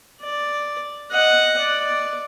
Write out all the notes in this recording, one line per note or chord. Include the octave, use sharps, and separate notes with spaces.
D5
D#5 F#5
D5